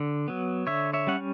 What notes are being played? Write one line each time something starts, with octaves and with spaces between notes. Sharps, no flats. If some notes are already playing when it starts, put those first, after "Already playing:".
Already playing: D3
F#3 B3
D3 C#5 E5
C#5 E5
G3 C#4 F#5